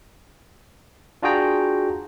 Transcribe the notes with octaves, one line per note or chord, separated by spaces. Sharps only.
D4 F4 F#4 G#4 G5 A#5